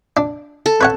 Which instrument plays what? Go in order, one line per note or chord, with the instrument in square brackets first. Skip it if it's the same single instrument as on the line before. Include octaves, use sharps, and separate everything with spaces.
[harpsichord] D4
[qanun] A4
[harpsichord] B4 C#5 F#5